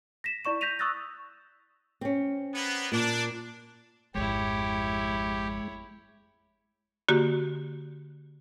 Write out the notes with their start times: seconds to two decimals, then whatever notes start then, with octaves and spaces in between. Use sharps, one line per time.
0.24 A#6 B6 E7
0.45 E4 D5 C#6 E7
0.61 G6 A#6 B6 D#7 F7
0.79 C#6 D#6 E6 F#6 A6 A#6
2.01 C4 C#4
2.53 A#3 B3
2.92 A#2 D4
4.15 G#1 F2 G#3 E4 G4 C#5
7.08 D3 A#3 F#4 G4